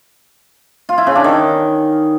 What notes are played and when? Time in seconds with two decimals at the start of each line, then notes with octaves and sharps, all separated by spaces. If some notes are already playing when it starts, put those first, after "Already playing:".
0.89 F4
0.98 E4
1.07 C#3
1.15 D4
1.24 D#3